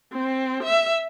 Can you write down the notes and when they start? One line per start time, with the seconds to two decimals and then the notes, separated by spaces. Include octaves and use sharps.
0.13 C4
0.63 E5